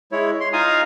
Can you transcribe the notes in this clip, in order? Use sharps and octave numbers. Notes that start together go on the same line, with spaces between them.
G#3 E4 C#5
C6
D#4 F4 F5 G#5 A#5 D#6